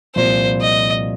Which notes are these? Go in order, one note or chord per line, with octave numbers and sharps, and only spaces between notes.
C2 A#2 F3 C5
D#5